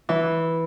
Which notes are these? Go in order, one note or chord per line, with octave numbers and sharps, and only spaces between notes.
E3